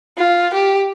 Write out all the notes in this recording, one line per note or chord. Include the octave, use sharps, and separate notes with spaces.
F4
G4